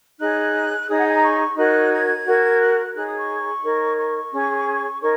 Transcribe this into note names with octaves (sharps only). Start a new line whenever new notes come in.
D#4 G#4 C#5 F#6
D#4 G#4 C#5 D#6
F#5
G#5
A#5
C#6
D#4 F#4 A#4 C#5 F#6
G#6
F#4 A#4 C#5
F#6
D#4 G#4 C#5 F#6
D#6
C#6
D#4 A#4 C#5
C#6
C#4 G#4 C#5
D#4 A#4 C#5 C#6